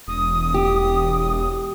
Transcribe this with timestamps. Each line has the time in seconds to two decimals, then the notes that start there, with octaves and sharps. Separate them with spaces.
0.08 E1 D#6
0.54 G4